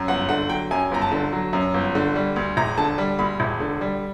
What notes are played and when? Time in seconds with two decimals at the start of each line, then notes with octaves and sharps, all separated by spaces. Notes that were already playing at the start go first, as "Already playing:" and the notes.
Already playing: F#2
0.08 G1 F#5
0.29 D3 F#5
0.49 F#3 G5
0.71 F#2 G#5
0.91 G1 A#5
1.02 A5
1.12 D3
1.33 F#3
1.53 F#2
1.74 G1
1.95 D3
2.16 G3
2.36 D2
2.57 E1 A#5
2.78 D3 A5
2.98 G3
3.19 D2 B5
3.40 E1
3.60 D3
3.81 G3